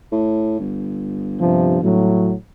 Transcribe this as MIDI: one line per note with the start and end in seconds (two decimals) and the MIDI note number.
0.12 0.57 45
0.60 2.41 31
1.40 1.81 43
1.40 1.81 48
1.40 1.81 53
1.82 2.34 45
1.82 2.34 54